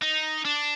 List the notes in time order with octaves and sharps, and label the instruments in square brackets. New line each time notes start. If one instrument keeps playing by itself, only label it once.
[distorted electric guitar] D#4
D4